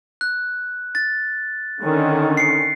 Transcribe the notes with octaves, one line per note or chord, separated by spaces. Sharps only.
F#6
A6
D3 D#3 C#4
C7 C#7